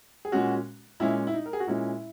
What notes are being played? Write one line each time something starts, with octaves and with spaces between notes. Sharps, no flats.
G#4
A#2 G#3 C#4 F#4
A#2 G#3 C#4 E4
E4
D#4
A#4
G#4
F#4
A#2 G#3 C#4 E4